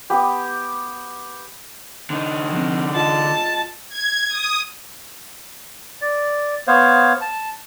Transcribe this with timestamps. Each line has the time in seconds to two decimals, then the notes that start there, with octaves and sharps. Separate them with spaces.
0.10 B3 G4
2.10 D3 D#4
2.52 F3 C4
2.95 F4 D#5 A5
3.88 G#6
4.28 D#6
6.01 D5
6.67 B3 C5 C#5 F5
7.21 A5